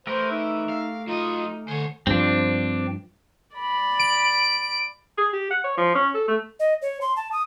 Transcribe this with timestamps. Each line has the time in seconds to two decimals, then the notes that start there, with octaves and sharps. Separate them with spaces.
0.07 E3 A3 G4 A#4 C5
0.31 D#4 E5
0.69 F5
1.08 F#3 D#4 F4 D#5
1.68 D3 C5 C#5 G#5
2.07 G2 F3 C4 D4
3.56 D5 B5
3.99 D7
5.18 G#4
5.33 G4
5.51 F#5
5.64 C#5
5.77 F3
5.95 C#4
6.14 A4
6.28 A3
6.60 D#5
6.82 C#5
7.01 C6
7.16 A5
7.32 D#6